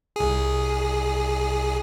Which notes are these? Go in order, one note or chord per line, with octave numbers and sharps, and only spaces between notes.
C2 G#4